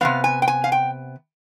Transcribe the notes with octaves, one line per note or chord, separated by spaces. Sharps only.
C3 G3 B3 F5
G#5
G5
G#5
F5
G5